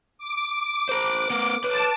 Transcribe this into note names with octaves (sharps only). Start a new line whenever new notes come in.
D6
A#4 C5
B3 A#4
B4 C#5 A5 D6